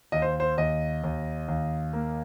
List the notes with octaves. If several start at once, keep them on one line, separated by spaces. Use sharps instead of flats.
D#2 D#5
C5
C5
D#2 D#5
D#2
D#2
A#3